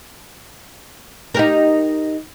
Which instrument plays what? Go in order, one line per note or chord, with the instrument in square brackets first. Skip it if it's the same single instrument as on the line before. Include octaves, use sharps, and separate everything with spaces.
[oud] D#4 G4 A#4